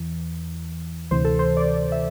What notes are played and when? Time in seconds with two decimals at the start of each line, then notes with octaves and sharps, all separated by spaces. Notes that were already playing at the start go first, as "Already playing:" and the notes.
Already playing: E2 E3
1.11 D2 C3 E3 C5
1.25 A4
1.39 C5
1.57 D5
1.92 E5